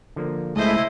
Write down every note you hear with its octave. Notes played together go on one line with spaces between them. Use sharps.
D3 F3 A#3
C#2 G#3 A3 E4 C5 D#5 E5